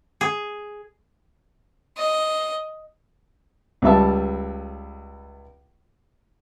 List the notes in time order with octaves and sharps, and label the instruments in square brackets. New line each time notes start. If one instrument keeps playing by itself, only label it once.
[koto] G#4
[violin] D#5
[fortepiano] C#2 G3 E5 A5